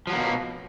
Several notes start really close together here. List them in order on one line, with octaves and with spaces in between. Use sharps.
F3 F#3 A#3 B2